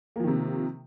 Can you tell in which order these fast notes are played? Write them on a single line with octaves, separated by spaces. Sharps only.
A#3 F3 D#3 C3